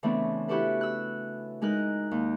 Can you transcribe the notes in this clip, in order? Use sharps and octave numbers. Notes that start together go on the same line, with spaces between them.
C#3 E3 A3 B3 C4 D4
E4 F#4 G4 A4 B4
E6 F#6
G#3 D#4 A#4 F#6
D#2